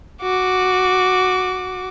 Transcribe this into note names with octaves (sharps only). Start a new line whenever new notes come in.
F#4 D6